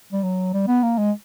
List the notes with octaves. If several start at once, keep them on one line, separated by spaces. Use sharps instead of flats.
G3
F#3
G3
B3
A#3
G#3